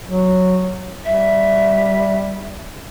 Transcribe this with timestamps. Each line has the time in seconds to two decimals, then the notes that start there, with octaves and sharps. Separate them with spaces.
0.06 F#3
1.05 G3 E5